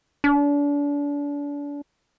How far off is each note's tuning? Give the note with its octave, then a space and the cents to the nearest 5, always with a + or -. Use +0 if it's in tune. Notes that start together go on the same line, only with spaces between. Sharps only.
D4 -35